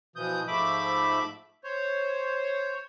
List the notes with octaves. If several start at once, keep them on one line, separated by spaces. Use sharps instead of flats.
B2 E3 F3 D#6 G6
G#2 F3 A3 E5 B5 D6
C5 C#5